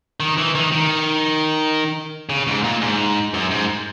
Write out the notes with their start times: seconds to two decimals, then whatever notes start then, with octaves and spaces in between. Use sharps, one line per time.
0.20 D#3
0.38 E3
0.55 D#3
0.72 D#3
2.29 C#3
2.47 G#2
2.64 A#2
2.81 G#2
3.34 F#2
3.51 G#2